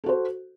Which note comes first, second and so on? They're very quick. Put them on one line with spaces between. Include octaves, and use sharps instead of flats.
A4 F#4 C5